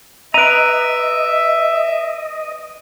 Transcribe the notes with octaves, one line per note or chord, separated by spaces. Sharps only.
B4 D#5 E5 A#5 D7 D#7